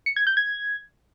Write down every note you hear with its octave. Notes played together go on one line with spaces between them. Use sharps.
C#7
G#6
G6
G#6